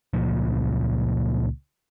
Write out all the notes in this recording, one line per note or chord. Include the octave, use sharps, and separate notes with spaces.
C#2 A#2 F3